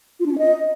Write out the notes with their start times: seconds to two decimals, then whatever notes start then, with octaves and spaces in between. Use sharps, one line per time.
0.20 F4
0.26 D4
0.32 C#4
0.38 D#5